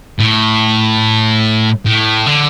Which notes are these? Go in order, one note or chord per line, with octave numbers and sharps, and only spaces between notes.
A2
A2
D3